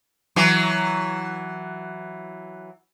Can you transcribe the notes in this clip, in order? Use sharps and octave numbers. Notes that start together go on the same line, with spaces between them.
E3 F#3